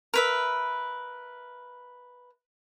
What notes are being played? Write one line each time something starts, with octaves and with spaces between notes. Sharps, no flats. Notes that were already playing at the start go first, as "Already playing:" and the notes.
A#4 B4 E5